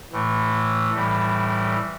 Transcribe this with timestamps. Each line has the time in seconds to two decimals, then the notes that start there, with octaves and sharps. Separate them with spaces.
0.12 A2 E3 A3
0.94 A2 E3 G3